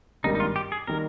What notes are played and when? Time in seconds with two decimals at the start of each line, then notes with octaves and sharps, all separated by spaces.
0.24 G#1 G2 D#3 G3 A#3 D#4
0.35 D#4
0.40 F4
0.56 G4
0.72 G#4
0.87 D#3 G3 A#3 A#4